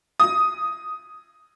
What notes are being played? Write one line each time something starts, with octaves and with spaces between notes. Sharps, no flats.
D#6